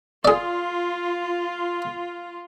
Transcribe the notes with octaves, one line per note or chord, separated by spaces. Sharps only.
F4 G#4 D5